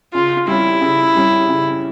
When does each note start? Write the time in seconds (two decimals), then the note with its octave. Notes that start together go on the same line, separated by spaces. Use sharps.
0.14 C#3 F4
0.48 G3 C#4 E4
0.81 C#3
1.16 G3 C#4
1.49 C#3